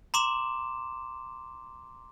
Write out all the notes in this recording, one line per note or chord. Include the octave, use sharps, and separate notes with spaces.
A#5 C6 D6 E7